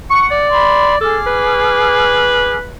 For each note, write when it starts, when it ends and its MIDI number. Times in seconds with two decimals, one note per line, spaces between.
0.10 0.50 78
0.10 0.26 85
0.31 1.00 74
0.51 0.94 83
0.51 0.94 84
1.01 2.56 68
1.01 1.17 69
1.01 2.56 86
1.01 2.56 89
1.26 2.77 71